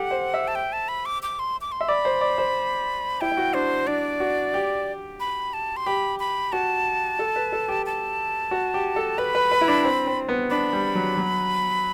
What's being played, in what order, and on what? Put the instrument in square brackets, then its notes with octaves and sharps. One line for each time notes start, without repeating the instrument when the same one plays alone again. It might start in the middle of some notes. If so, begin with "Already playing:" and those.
Already playing: [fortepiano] G4 A4 [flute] F#5
[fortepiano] C5
E5
[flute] A5
G5
A5
B5
D6
D6
C6
D6
C6
[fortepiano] E5
[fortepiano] D5 [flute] B5
[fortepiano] C5
D5
C5
[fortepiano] E4 [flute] G5
[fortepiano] E4
F#4
[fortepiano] D4 [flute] C5
[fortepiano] D4 [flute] D5
[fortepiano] F#4
G4
[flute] B5
A5
C6
[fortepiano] G4 [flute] B5
[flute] B5
[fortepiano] F#4 [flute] A5
[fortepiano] A4
B4
A4
G4
[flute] A5
[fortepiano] F#4
G4
A4
[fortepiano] B4 [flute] B5
[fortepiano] B4
B4
E4
D4
C4
C4
B3
[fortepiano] D4 [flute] B5
[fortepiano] G3
F#3
F#3